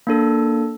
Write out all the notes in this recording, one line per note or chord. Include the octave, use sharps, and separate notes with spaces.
A#3 D4 A4